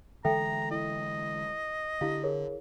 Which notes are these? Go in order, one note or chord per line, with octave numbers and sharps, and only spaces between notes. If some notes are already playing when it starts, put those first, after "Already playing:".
D3 E3 G#3 A4 E5 G5 A#5
E4 D#5
D3 E4 G4 F5
G#4 A#4 C#5